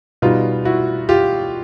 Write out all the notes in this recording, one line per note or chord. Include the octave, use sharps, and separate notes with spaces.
B2 G3 B3 D#4 F4
E4 F#4
F4 G4